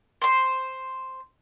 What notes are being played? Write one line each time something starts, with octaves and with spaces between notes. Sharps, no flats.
C5 C6